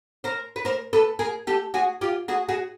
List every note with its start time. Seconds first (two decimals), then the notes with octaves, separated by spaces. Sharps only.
0.24 A#4 C5
0.56 B4
0.65 A#4 C5
0.93 A4 B4
1.19 G#4 A#4
1.47 G4 A4
1.74 F#4 G#4
2.01 F4 G4
2.28 F#4 G#4
2.49 F#4 G#4